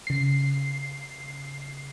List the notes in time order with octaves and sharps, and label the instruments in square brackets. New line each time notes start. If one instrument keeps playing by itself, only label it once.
[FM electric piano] C#3 C7